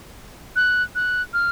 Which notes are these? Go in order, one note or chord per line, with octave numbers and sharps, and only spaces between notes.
F#6
F#6
F6